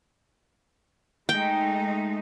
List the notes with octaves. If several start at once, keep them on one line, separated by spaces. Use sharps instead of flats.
G#3 A3 D#4 G5